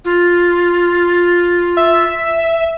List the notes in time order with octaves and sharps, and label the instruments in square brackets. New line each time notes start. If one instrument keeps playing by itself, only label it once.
[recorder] F4
[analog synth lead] E5